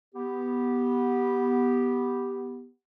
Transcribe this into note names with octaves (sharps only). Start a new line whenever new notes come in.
B3 G4